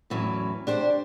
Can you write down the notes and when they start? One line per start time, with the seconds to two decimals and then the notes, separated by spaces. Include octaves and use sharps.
0.10 E2 A2 E3 F#3 C#4
0.67 D4 G4 C5